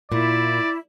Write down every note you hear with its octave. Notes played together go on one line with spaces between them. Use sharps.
A#2 E4 D5